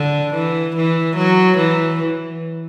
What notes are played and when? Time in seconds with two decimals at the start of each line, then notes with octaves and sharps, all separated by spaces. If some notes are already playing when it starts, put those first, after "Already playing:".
Already playing: D3
0.34 E3
0.76 E3
1.16 F#3
1.57 E3